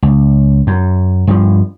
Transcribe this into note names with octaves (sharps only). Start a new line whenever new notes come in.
C#2
F#2
G2 F3